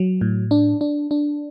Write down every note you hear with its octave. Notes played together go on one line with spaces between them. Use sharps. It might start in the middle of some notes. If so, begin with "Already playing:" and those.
Already playing: F#3
A2
D4
D4
D4